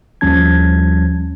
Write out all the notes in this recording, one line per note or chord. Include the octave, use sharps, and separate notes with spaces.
D#2 F3 G3 C#4 A5 G#6